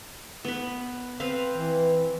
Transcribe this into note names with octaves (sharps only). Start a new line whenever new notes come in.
B3 B4
C4 B4 F5
E3